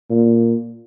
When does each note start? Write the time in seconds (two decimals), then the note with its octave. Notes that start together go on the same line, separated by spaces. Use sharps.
0.10 A#2